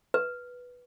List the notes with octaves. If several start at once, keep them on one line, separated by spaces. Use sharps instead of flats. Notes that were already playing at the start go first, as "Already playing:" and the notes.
B4